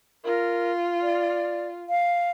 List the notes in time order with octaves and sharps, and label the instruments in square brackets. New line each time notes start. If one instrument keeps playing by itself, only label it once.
[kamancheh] F4 [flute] A#4
[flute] D5
F5